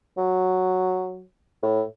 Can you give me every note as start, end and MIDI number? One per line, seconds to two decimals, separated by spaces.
0.18 1.22 54
1.63 1.82 45